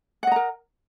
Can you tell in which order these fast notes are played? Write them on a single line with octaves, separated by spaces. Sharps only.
F#5 D#5 A#5 A#4